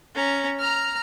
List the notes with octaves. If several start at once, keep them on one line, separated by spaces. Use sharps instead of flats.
C#4 A#5
A#5 F6